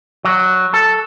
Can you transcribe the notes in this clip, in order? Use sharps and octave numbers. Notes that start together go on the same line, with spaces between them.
F#3
A4